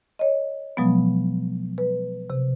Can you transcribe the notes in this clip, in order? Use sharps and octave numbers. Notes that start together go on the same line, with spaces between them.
C#5 D#5
B2 F3 F#3 G#3 B3
B4
C3